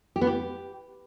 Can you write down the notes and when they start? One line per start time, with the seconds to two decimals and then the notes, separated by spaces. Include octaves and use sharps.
0.16 G4
0.21 B3
0.27 G4